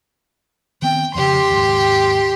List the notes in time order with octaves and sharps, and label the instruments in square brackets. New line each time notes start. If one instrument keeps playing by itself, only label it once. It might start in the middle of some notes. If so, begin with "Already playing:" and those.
[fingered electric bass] D#3 B3 C4 [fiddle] G5
[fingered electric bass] F2 C#3 [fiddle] G4 C6
[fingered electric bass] D#2 G#2